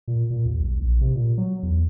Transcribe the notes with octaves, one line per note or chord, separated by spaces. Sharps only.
A#2
A#2
D#2
B1
A#1
C3
A#2
F#3
E2